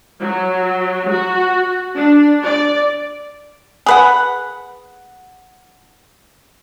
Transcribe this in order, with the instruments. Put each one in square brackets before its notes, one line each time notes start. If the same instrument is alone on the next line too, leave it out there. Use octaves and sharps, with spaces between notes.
[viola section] F#3
F#4
D4
D5
[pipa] G#4 B4 F#5